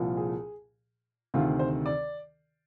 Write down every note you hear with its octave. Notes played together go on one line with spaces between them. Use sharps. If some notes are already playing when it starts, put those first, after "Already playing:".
Already playing: C2 A#2 F3
G#4
D2 C3 D#3 F4
C5
D5